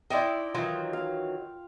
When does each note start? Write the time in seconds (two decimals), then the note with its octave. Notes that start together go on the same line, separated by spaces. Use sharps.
0.10 D#4 E4 D5 G5 C6
0.54 D#3 E3 F#3 F4
0.93 F5